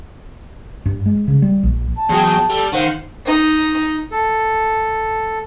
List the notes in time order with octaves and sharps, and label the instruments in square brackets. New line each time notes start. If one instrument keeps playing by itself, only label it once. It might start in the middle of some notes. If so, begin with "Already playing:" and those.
[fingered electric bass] G2
G#3
C#3
G3
A#1
[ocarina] A5
[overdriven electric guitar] E2 F#3 [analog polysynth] G#4 G5
[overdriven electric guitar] G3 [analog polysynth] A4
[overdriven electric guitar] D#3 [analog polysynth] C5 F5 F#5
[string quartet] D#4
[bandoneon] A4